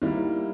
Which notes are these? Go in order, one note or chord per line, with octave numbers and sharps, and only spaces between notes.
D#3 G3 A#3 E4